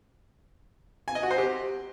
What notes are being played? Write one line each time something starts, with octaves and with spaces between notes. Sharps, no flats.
G#5
D#5
F#4
C5
G4